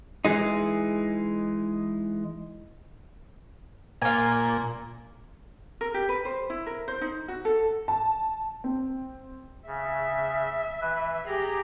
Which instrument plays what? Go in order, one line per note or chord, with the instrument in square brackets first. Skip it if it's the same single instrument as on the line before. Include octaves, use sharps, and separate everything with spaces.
[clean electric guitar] E3 G#3 D#4
[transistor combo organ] A#2 [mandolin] F4 G#5
[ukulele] A#4
G4
B4
C5
E4
A#4
C5
D#4
F#4
A4
[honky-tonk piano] A5
C4
[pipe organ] C#3 [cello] E5
[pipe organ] E3 B4
[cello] G4 G#4 [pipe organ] A#5